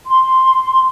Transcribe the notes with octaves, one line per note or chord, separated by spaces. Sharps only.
C6